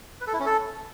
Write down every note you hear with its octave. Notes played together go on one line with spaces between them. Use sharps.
B4
A4
E4
C#4
A4